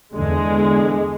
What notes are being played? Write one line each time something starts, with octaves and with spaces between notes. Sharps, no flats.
E2 D3 G#3